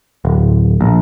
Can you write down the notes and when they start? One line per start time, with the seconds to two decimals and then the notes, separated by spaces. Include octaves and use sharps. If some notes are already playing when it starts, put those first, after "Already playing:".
0.25 D1
0.81 A#1